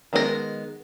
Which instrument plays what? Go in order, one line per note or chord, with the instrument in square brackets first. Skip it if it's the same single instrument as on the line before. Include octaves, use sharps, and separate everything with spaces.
[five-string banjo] D#3 G#3 B3 D#4 A#4